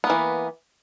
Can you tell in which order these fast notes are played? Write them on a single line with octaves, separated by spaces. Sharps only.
B3 A#3 E3